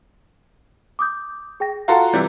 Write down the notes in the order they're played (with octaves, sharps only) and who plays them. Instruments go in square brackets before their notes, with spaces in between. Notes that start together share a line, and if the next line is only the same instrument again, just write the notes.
[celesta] D6 D#6 G6
G#4 G5 A#6
[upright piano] F4 F#4 A4 [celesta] F5 A#5 C6
[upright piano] C3 E3 G3